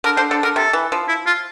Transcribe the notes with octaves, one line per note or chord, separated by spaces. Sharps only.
D3 A#4
D3 C5
D3 A4
D3 A#4
C3 A4
E3
F3
E4
F4